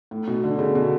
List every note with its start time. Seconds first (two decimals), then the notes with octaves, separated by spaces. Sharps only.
0.11 A2
0.28 B2
0.44 D3
0.59 C#3
0.75 B2